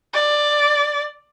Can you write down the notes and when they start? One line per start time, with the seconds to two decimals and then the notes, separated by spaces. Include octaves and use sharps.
0.14 D5